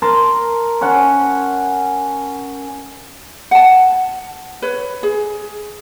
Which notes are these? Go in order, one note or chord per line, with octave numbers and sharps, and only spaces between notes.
A#4 A5 C6
C#4 F#5 A5
F#5 A5
B4 C#5
G#4